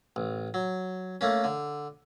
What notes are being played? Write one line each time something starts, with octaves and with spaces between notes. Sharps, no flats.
A1
F#3
A3 A#3 C#4
D3